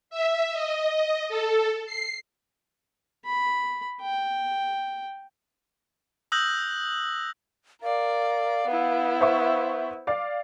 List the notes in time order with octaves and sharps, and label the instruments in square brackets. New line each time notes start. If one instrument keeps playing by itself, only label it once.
[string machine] E5
D#5
A4
C7
[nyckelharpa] B5
G5
[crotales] D#6 E6 F#6 G6 A#6 F#7
[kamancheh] A#4 D5 [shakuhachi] F5
[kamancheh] B3 E4
[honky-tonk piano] C5 E5 C#6
D5 F5 A6